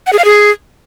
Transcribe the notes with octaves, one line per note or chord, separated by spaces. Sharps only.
F#5
G#4
F5
G#4